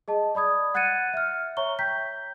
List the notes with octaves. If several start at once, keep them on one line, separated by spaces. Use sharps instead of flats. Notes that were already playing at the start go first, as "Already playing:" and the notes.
G#4 D#5 A5
D5 B5 D#6 G#6
F#5 F#6 G#6 A6 C#7 D#7
E5 F6
C#5 E5 A#5 C#6 G7
G5 A#5 G6 B6